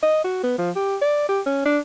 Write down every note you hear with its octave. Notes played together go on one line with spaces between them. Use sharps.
D#5
F#4
B3
F3
G4
D5
G4
C#4
D4